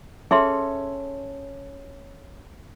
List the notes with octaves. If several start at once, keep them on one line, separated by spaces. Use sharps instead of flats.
C#4 G#4 A4 E5 C6